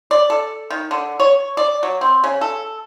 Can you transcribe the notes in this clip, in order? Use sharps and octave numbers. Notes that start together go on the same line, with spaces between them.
D5
A4
D#3
D3
C#5
D5
F#3
C4
C#3
A4